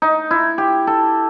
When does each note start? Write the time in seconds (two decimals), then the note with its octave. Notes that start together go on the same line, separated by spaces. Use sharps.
0.02 D#4
0.31 E4
0.58 G4
0.87 A4